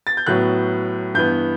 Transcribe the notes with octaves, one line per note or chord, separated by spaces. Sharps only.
A6
G6
A2 F#3 B3 F#6
G2 E3 B3 G6